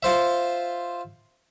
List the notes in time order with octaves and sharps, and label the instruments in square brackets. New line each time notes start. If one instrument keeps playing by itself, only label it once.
[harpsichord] F4 C5 E5